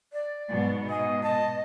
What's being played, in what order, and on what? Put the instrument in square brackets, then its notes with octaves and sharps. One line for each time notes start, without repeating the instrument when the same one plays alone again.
[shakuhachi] D5
[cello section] G#2 B2 B3
[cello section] B2 [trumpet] D#5 [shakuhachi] G#5
[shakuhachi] D#5 [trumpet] A5